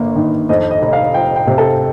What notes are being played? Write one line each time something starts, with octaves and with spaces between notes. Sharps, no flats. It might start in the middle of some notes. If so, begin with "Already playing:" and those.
Already playing: G1 A#3
D#3
F2 D#5
D#5
F1
F5
F3 G5
G5
C3
A4